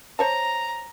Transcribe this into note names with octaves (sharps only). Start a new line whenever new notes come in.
C5 C#5 A5 A#5